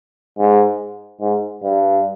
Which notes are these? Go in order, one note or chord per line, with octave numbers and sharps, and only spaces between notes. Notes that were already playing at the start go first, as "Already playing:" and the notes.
G#2
G#2
G2